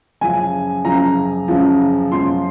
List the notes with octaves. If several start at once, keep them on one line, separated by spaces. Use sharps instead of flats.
F#2 C#3 F3 G#5
F#2 C#3 F3 A#5
F#2 C#3 F3
F#2 C#3 F3 C6